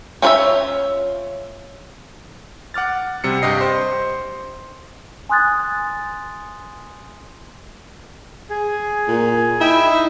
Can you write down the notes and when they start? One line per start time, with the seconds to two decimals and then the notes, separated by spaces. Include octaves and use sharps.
0.22 C#4 F4 B4 C#5 E5
2.74 F#5 D6 F6 A6
3.24 C3 G3 C#7
3.42 G2 G4 D#5 C7
3.61 C5
5.29 G#5 C6 D#6 F#6 G#6 A6
8.50 G#4
9.08 A#2
9.61 E4 D#5 G5
9.84 D#4